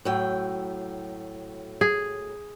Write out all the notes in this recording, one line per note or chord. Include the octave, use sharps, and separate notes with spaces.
A2 F#3 G5
G#4